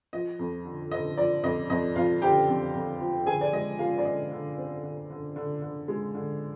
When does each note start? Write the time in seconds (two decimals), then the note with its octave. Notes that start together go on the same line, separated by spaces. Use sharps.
0.13 F3 D#5
0.39 F2
0.65 D3
0.91 D3 D#5
1.17 F3 D5
1.43 F2 D#5
1.70 F2 D#5
1.96 F2 F4 F5
2.22 D3 G4 G5
2.48 F2
2.74 F2
3.00 F3
3.26 D3 G#4 G#5
3.41 D5
3.53 G#3 D#5
3.79 G#3 F4 F5
3.98 D5
4.05 D3 D#5
4.31 D3
4.58 C4
4.84 D3
5.10 D3
5.36 D3
5.62 D3
5.88 G#3
6.15 D3